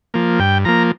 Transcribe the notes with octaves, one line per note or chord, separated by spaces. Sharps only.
F3 A#3
G2 G5
F3 A#3 A#5